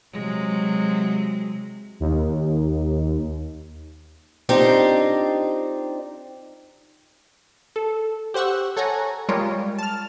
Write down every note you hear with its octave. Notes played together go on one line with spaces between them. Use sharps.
C3 F#3 G#3
D#2
C4 D4 D#4 F4 G4
A4
G4 C5 F#5 C#6 E6
A4 C#5 F#5 G#5 A#5
G3 G#3 F4 G4 A#4 C#5
A5 F6